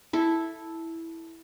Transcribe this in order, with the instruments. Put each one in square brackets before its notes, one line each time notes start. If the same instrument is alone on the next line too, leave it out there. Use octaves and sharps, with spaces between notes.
[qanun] E4 A4